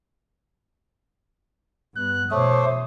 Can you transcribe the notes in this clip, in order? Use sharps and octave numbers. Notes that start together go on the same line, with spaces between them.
G2 B3 F#6
F#2 B2 E3 A3 C5 C#5 D6 D#6